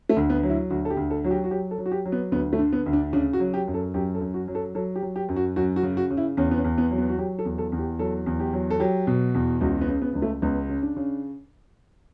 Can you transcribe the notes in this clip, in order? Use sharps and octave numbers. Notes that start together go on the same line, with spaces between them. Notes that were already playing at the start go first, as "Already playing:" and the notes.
A3
D2
B3
F#3
E4
D2 F#4
A4
G4
D2
A4
F#3 F#4
G4
F#4
F#3 G4
A4
F#3
F#4
G4
F#3
B3
D2 B3
A3
D3
B3
D2
D4
C#3 D4
F#4
F#3
G4
F#2
A4
F#2 G4
A4
F#2
F#4
F#3
A4
F#3 A4
G4
F#3
G4
F#2
F#4
F#2 F#4
F#4
C#3
F#4
C#3
E4
E2 C#4
B3
C#4
E2
B3
F#3
B3
F#4
F#3 G4
A4
E2
A4
E2
G4
F#3 A4
E2
G4
F#3
A4
F#3 G4
B2
E2
C#2 F#4
B3
C#3
B3
C#2 B3
A3
C#2 B3
C#3
D4
C#3